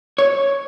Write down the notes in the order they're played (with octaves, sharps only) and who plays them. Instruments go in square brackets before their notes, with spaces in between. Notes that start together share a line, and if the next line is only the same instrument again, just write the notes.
[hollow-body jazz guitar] C#5